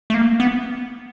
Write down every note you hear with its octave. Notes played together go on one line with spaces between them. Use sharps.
A3
A#3
B3